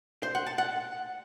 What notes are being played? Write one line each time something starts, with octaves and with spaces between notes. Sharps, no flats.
C5
F#5
A5
F#5